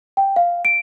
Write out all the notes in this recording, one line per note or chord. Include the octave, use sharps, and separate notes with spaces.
G5
F5
D7